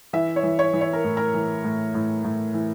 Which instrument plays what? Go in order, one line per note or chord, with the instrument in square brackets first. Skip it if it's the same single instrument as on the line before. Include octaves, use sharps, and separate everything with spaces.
[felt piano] E3 E5
C#5
E3
C#5
E3
C#5
A#4
A2
A#4
E3
A2
A2
A2
E3